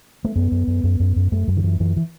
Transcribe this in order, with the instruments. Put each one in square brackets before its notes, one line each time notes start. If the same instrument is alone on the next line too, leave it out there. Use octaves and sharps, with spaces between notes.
[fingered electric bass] A3
F#2 B3
F#2
F#2
F#2
F#2
F#2
F#2 A3
F#2 F#3
D#3
F#2 E3
F#2 E3
E3